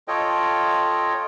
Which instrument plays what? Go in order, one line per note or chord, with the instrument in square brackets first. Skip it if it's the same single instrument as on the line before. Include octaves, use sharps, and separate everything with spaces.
[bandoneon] F4 A4 C#5 D#5 G5